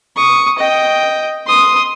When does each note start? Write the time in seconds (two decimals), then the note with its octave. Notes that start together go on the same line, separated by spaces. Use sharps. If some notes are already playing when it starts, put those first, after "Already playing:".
0.16 C#6 D#6
0.59 D#5 G5
1.47 C6 D#6